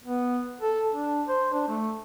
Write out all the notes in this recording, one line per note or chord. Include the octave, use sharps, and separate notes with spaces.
B3
A4
D4
C5
D4
A3